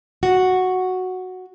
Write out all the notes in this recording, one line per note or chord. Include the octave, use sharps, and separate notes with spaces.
F#4